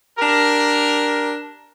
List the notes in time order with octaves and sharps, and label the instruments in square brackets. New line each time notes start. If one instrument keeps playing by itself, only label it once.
[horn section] D4 G4 A#4